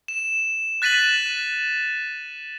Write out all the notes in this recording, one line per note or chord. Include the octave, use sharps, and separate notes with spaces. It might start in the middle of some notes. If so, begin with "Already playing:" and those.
E7
F#6 A6 B6 D#7 E7 F#7